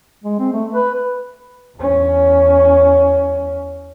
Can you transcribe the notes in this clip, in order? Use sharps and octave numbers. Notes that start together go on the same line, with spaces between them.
G#3
C4
A3
B4
E2 C#4